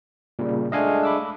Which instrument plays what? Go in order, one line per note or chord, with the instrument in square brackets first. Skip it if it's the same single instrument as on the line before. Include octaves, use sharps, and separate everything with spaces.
[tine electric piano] A#2 C#3 G3
[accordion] G#3 A3 D4 [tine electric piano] D#5 F5 G#5
[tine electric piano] B5 D6 E6